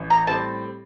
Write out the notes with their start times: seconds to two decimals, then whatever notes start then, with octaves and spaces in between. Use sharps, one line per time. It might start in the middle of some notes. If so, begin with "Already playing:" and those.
Already playing: A1
0.10 A#5
0.27 A2 G3 C4 A5